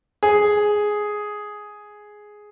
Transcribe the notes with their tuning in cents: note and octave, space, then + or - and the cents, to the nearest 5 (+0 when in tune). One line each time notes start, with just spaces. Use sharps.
G#4 +5